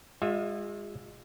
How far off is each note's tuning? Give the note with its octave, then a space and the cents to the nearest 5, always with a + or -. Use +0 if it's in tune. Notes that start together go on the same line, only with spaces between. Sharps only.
G#3 -30 F4 +30 E5 +0